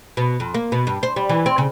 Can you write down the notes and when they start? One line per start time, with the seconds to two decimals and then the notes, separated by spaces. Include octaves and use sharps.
0.17 B2
0.40 F2
0.54 A#3
0.72 B2
0.87 G2
1.03 C5
1.16 G3
1.29 E3
1.46 C4
1.58 C#3